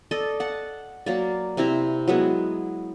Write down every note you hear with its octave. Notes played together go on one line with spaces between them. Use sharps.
A4 D5 D#5
F#5 A5
F#3 A#3 D5
C3 C4 E4 A#5
F#3 G#3 B3 E4